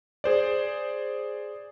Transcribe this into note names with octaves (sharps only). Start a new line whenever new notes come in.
G#4 C5 D5